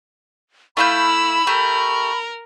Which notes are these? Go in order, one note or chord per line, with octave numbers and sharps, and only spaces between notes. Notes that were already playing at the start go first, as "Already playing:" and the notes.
A3 E4 F5 B5 E6 G6
A3 G4 A#4